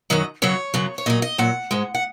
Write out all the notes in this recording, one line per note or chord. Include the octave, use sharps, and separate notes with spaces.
F#2 D#3 F#3 D#5
F#2 C#3 F#3 C#5
F#2 C#3 F#3
C#5
A#2 F#3 D#5
D#5
A#2 F#3 F#5
G#2 G#3
F#5